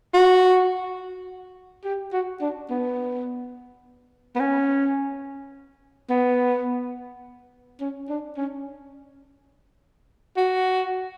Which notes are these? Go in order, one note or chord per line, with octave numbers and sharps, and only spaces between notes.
F#4
G4
F#4
D4
B3
B3
C#4
B3
C#4
D4
C#4
F#4